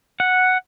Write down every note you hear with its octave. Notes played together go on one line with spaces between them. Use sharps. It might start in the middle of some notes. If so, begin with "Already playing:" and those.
F#5